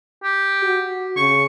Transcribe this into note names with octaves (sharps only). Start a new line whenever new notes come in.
G4
F#4
C#3 C#6